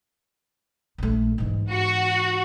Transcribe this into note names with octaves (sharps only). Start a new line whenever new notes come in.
A#1 A3
G#2 E3
F#4